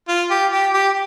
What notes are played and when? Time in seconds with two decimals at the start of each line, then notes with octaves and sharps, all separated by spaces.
0.08 F4
0.30 G4
0.52 G4
0.74 G4